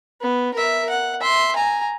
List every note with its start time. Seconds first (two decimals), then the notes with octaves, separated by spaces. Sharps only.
0.21 B3
0.54 A#4 E5
0.90 F#5
1.21 E5 C6
1.56 G#5 A#5